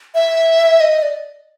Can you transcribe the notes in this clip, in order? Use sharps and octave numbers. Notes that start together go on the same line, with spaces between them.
E5
D#5
D5